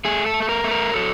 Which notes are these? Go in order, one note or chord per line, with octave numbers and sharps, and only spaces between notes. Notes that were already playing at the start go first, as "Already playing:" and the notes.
A3 G#4
A4
A3
A4
A#4
A3
A#4
F#3 A4